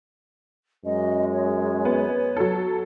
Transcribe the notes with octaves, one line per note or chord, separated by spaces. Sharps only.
F#2 G#3 D#5
C#5
B3
F#3 A4